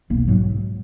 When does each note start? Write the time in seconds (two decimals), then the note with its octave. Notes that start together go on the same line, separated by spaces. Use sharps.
0.10 D#1 B1 A#3
0.28 G#2 F#3